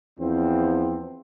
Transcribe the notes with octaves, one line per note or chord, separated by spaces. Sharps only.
E2 F3 C4